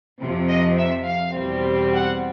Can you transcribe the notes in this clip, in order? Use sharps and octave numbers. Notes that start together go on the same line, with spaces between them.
F2 C3 F3
D#5
E5
F5
E2 B2 G3 C4
F#5